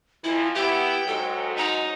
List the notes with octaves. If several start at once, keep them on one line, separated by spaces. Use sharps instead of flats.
F2 E3 E4
B3 E4 G4 G5
G#2 F#3 A4
D#4 A#5